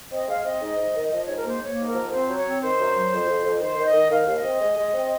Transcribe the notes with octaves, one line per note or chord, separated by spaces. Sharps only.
C4 D#5
G#3 F5
C4 D#5
G#2
G#2
D#3
F3 D#5
G#2 C#5
A#4
A#3 C5
A#3 C#5
G#2
A#4
F3
C4 C5
F#3
C#5
C4
D#3 C5
F#2
F#3
F2
F2
F2
D#3 C5
D#3
D#5
D#3
D#3 F5
D#2
D#5
C4
G#3
G#3
C4